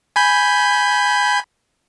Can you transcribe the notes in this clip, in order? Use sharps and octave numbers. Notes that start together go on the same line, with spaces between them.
G#5 B5 G6